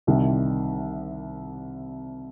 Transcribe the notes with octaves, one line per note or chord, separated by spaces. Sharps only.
C2 C3 D#3 G3